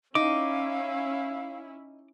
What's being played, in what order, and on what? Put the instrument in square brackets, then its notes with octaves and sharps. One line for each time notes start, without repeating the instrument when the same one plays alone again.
[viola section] C#4 E4 [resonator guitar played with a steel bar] D#4 [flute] F5 [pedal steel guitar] D6